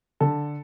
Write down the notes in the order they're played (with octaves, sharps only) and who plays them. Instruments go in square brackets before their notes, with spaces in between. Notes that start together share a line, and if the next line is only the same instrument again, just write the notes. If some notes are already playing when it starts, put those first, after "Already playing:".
[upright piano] D3 A4